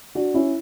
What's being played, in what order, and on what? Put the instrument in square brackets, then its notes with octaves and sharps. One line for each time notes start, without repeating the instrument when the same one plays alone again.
[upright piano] D4 F#4
C#4 E4